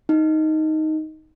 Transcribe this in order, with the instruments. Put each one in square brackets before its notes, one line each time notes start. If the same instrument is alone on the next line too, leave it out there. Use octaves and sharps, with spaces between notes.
[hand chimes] D#4